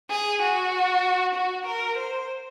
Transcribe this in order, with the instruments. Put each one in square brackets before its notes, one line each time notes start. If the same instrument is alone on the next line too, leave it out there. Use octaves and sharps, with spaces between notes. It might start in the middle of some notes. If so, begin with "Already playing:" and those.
[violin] G#4
F#4
F#4
A#4
C5